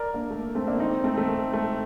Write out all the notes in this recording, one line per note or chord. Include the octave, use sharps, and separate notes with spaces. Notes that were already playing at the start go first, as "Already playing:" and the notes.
Already playing: A#4 D5
A#3 D4
A3
A#3
A3 C4
A#3 D4
C4 D#4
A3 C4
A3
A3
A3